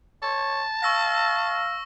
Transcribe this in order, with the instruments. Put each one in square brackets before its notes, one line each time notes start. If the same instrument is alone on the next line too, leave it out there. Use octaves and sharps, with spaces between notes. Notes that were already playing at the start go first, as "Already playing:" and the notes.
[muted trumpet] C#5 [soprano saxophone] A5
[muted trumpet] F5 [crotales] C#6 E6 A#6